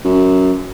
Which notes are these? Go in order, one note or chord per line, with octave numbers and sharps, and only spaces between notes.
F#2